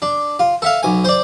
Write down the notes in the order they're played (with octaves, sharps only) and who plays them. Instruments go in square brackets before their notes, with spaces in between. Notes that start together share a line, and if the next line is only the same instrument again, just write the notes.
[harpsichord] D4
F4
A4 E5 F5
B1 G#5
C5 D5